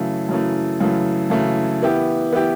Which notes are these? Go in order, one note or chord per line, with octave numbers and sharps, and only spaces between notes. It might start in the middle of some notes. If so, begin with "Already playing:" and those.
Already playing: F#2 C#3 E3 A3
F#2 C#3 E3 A3
F#2 C#3 E3 A3
F#2 C#3 E3 A3
E3 B3 E4 G4
E3 B3 E4 G4